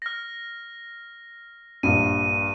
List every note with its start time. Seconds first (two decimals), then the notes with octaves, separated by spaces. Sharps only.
0.02 F6 A#6
1.83 A#1 G2 D#7